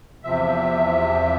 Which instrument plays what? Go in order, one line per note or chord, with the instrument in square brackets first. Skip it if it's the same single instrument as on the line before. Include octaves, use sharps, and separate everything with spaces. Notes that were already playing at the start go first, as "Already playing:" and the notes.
[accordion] E2 C3 F3 E5